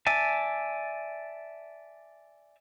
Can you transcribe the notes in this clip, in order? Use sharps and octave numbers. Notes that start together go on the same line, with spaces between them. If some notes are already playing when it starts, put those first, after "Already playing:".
D5 E5 G#5 A5